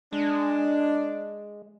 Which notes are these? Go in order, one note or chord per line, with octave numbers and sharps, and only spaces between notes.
G#3 D4